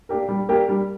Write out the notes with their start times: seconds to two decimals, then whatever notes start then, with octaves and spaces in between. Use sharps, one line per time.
0.09 A#3 D4 G4 A#4
0.29 G3
0.49 A#3 D4 G4 A#4
0.69 G3